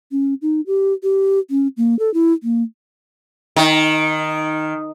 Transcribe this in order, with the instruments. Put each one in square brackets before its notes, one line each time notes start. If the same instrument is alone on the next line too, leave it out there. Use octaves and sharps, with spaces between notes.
[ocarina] C#4
D#4
G4
G4
C#4
A#3
A4
E4
A#3
[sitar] D#3